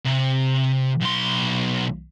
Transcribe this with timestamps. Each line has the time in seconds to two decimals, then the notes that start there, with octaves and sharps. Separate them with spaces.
0.06 C3
1.00 B1 C6